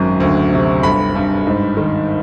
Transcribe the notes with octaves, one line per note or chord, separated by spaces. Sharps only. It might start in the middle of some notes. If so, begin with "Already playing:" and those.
Already playing: G#1 F#2
D2
C3
G1 B5
G2
G#2
D#3